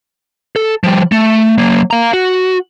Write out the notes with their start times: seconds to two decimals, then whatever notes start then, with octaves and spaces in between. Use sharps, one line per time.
0.56 A4
0.84 F3 G3
1.12 A3
1.58 F#3 A#3
1.91 F5 A#5
2.13 F#4